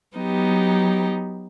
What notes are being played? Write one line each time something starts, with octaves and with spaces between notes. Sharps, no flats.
F#3 B3 D#4 G4